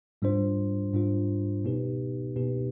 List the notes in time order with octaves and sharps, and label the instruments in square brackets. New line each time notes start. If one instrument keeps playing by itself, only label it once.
[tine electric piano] G#2 G3 D4 F4 C5
G#2 G3 D4 F4 C5
B2 B3 D#4 G4 B4
B2 B3 D#4 G4 B4